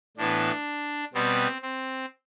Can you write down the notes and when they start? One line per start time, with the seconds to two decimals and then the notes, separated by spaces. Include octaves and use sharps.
0.17 A2 E3 B3 D4
1.14 B2 G3 B3 C4
1.62 C4